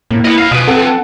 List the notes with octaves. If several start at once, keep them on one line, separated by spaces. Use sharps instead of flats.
A2 A#3
B3 E4 D#5
D#5 F5 C7
B2 F3 B4 D#6 D7 D#7
C4 A4 F#5 A5